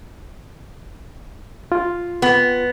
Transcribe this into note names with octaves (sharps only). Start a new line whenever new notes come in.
F4
B3